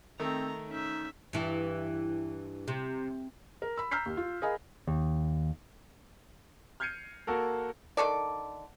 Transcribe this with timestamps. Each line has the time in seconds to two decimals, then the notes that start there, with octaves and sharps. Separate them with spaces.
0.19 D#3 A3 C4 A#5
0.68 C#4 D#4 E5
1.33 G2 E3
2.68 C3
3.62 A#4
3.78 B5 E6
3.91 A#5 E6 F6 G6 B6 C7
4.06 D#2
4.17 F4
4.42 G#4 A#4 D#5 F5 G#5 B5
4.87 D#2
6.80 F6 G6 G#6 C7 C#7 D#7
7.27 A#3 F#4 A4 A#4
7.97 D3 D#3 A4 D5